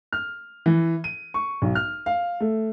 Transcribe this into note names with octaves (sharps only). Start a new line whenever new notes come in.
F6
E3
D#7
C#6
B1
F6
F5
A3